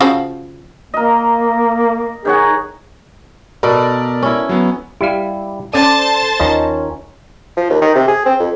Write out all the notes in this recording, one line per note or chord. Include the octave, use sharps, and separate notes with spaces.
C#3 F3 F#4
A#3 A#4 D#5
D#3 G#4 C#5 F#5
B2 A4 A#4 D5 B5
C#4 E4
F#3 B3
G3 E4 G4 F5
C#4 A4 C5 D5 A5 D#7
D#2 D#3 C#4 F4 A#4 D#5
F3
D#2
D#3
C3
G#4
C4
F2